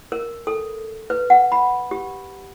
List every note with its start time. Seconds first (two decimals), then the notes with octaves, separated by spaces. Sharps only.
0.12 A#4
0.47 A4
1.10 B4
1.30 F#5
1.52 B5
1.91 G4